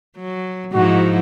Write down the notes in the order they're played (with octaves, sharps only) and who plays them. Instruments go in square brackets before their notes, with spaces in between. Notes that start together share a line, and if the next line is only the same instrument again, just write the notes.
[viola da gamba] F#3
[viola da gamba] G#2 D#4 E4 [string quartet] F3 [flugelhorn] F#4